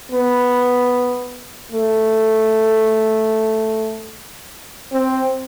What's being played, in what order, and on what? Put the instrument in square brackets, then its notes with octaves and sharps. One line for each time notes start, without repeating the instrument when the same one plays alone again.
[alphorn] B3
A3
C4